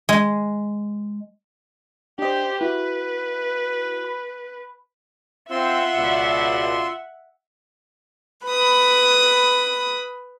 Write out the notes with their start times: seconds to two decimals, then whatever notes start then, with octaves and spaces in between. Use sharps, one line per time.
0.09 G#3
2.19 D4 G4 C5 D#5
2.61 E4 F#4 B4
4.04 B5
5.51 C4 F4 E5 F#5 C6 E6
5.95 C#2 B2 D5
8.45 B4 B5 D#6